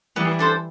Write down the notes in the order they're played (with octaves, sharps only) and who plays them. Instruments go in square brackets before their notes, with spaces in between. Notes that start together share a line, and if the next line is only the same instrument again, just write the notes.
[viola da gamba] E3 G3 [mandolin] B3
[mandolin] D4 A4 C5